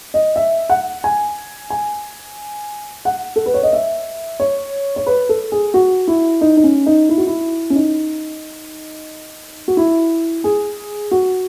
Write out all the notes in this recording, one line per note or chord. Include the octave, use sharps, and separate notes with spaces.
D#5
E5
F#5
G#5
G#5
F#5
A4
B4
C#5
D#5
E5
C#5
C#5
B4
A4
G#4
F#4
E4
D#4
D#4
C#4
D#4
E4
F#4
E4
C#4
D#4
F#4
E4
G#4
F#4